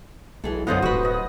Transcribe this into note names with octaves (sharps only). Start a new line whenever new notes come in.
B1 E3 G#4 A4
F#2 D3 B3 F4 C5 D#5 F#5
D1 F#4 B4 C#6
B3 D#5